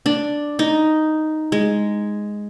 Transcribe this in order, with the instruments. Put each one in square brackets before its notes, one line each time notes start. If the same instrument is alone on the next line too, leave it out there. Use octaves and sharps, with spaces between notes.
[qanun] D4
D#4
G#3